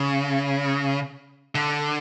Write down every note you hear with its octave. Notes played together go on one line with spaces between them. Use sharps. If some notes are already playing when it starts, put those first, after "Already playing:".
Already playing: C#3
D3